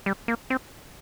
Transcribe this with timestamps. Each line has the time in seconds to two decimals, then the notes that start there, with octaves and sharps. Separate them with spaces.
0.06 G3
0.28 A#3
0.50 C4